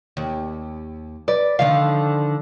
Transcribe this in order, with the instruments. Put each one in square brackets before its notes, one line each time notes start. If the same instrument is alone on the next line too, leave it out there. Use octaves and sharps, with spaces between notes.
[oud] D#2
[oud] B4 [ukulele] D5
[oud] D3 D#3 F3 [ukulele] F5